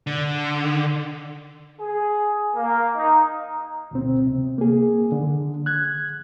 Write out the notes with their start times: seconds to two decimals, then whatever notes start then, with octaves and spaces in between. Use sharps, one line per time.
0.07 D3
1.81 G#4
2.56 A#3
2.97 D#4
3.91 D2 B2 C4
4.27 C3
4.58 A#3 G#4
5.12 D3
5.66 F#6 G#6